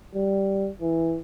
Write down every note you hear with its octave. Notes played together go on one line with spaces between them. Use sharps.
G3
E3